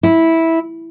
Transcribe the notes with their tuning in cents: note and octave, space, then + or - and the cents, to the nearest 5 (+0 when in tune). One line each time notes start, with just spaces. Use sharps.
E4 -10